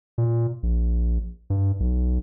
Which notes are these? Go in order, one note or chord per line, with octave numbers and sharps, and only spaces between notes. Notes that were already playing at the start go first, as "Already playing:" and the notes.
A#2
A#1
G2
B1